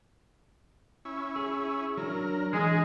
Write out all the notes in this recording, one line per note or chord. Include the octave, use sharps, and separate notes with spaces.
C#4 E4
G#4
F#3 D4 A#4
E3 G#3 D4 G#4